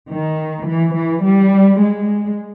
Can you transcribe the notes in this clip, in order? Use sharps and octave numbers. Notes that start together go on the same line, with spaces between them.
D#3
E3
E3
G3
G#3